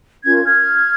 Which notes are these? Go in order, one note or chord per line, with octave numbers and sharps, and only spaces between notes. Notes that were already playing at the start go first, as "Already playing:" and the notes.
C#4 F4 A#4 G#6
F6 G#6